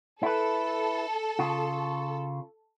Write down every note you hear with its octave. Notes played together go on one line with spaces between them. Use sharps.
E4 A4 B4
C#3 F4